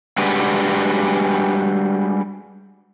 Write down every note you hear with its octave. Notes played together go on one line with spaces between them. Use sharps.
G3 G#3 D4 F#4 G4 B4